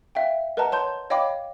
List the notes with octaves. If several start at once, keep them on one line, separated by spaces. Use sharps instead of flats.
E5 F5 G5
A#4 B4 D#5 F#5 A5 A#5
C#5 A5 C6 G6
C#5 D#5 F5 G5 B5 D6